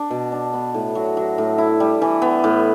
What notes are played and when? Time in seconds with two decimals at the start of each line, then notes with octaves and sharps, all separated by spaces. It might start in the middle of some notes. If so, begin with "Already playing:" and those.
Already playing: D4
0.11 B2
0.32 D4
0.53 B3
0.74 A2
0.95 F#3
1.17 F#3
1.38 A2
1.58 E4
1.80 G3
2.02 E3
2.22 B3
2.44 A2